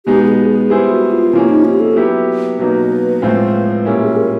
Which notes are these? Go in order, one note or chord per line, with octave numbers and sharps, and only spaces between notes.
B2 G#3 B3 D#4 G4
G4
G#4
G#4
G3 B3 E4 G4 G#4 C5
F#4
F4
C3 F3 A#3 C#4 E4
D#4
G4
A4
F#3 B3 E4 G4
B2 F#3 A#3 D#4 B4
A2 F3 G#3 C4 F4
A#2 G3 A#3 C#4 E4 A#4
G#4
A#4